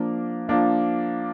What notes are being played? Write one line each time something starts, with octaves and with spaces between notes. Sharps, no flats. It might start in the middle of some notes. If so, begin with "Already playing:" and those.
Already playing: F3 A#3 D4
F3 A#3 D4